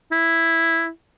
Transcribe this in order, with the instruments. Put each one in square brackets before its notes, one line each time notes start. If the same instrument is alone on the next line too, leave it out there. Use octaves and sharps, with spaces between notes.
[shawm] E4